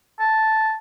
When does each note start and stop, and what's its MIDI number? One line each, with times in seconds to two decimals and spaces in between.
0.20 0.75 81